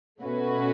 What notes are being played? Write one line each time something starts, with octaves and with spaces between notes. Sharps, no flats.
B2 A3 C#4 F#4 B4